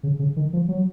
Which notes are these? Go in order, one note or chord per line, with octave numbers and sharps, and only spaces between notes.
C#3
C#3
D#3
F3
F#3